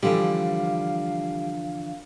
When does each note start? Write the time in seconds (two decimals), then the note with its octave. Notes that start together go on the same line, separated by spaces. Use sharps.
0.03 D3 E3 F3 G3 F5